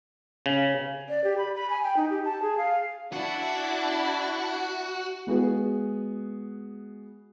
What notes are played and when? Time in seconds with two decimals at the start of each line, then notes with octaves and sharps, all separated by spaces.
0.46 C#3
1.09 D5
1.24 G4
1.38 B5
1.55 B5
1.70 G#5
1.83 G5
1.96 D#4
2.10 G4
2.25 A5
2.42 G#4
2.58 F5
3.13 D4 E4 F#4
5.27 G#3 B3 F#4 G#4